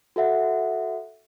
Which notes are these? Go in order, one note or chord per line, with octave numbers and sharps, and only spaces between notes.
F#4 A4 E5 F#5